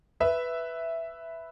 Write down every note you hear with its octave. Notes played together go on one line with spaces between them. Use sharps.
B4 E5